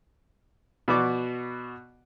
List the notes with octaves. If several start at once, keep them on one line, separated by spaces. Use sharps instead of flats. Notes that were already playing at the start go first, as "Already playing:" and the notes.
B2 B3 F#4 D5 D6